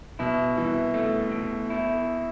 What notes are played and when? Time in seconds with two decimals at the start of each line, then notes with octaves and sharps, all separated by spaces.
0.19 B2 E4
0.57 C2 E3
0.94 A3
1.31 B2
1.70 E4